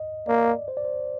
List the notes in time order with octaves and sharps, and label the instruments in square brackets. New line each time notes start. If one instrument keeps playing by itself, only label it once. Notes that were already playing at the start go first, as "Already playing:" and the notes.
Already playing: [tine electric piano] D#5
[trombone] A#3 [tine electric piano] D5
[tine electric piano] C5
D5
C5